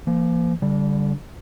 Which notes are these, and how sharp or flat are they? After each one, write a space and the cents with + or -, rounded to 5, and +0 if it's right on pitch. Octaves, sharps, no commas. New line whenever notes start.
F3 -40 A#3 +0
D3 -30 G3 +0